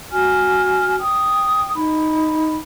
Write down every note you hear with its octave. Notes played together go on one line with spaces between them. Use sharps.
F#4 G#5 F6
G5 D#6
D#4 B5